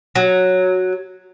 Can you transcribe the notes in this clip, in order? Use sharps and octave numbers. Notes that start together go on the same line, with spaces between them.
F#3